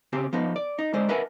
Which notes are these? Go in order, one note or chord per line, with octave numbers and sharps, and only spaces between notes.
C#3 C4 G4
F3 B3 D#4
D5
D#4
G#3 C5 D5
A#4 B4 E5 F#5 G#5 A5